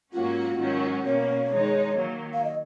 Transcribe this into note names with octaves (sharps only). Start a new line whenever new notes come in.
G#2 F#3 A#3 C#4 F4 F#4
G#2 D#3 F#3 C#4 F#4
B2 A#3 C#4 C#5
D#3 G#3 D#4
D#3 F#3 A#3
F5
D#5